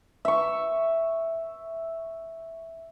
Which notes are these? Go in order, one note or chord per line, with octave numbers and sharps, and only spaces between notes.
E5 C#6